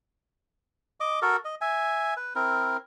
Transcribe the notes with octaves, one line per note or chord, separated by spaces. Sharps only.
D#5 D6
F#4 A4 A#4
D#5
E5 G#5
B4
C4 E4 A#4